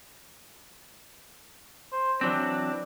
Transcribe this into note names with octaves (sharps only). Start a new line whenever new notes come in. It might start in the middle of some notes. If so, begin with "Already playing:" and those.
C5
E3 F#3 C4 D4